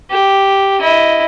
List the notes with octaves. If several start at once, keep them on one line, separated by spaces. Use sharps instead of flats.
G4
E4 D#5